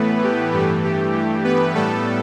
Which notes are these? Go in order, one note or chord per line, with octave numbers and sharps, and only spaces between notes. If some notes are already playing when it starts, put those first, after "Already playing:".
Already playing: A2 E3 A3 B3 B4
G4
G2 E3 A3 G4
G4
G4
B3 B4
A2 G3 A3 B3 A4